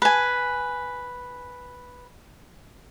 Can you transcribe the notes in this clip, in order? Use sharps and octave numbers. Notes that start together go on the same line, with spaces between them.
B4 G#5